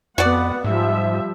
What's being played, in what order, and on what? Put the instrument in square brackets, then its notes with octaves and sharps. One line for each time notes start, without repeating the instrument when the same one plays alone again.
[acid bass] F2 [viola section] B3 F#5 [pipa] F#4 D5
[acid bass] G#2 [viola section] F3 G3 E5